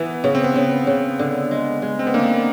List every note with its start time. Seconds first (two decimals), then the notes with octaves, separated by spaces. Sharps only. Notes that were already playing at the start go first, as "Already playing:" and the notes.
Already playing: E3 B3
0.24 C#3 B3
0.35 C4
0.44 B3
0.56 C#3
0.87 C#3
1.19 D3
1.51 G#3
1.82 G#3
1.99 C4
2.07 B3
2.14 D3 A#3